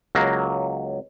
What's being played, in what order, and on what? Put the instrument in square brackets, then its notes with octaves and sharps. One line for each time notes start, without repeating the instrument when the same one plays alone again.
[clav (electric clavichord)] C#2 F#3 A#3